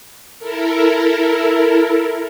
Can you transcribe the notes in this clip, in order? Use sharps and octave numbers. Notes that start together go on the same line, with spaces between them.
E4 A4 A#4